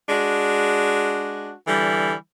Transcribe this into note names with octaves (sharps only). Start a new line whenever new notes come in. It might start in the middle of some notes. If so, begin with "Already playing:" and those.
G#3 D4 F#4
D3 E3 G3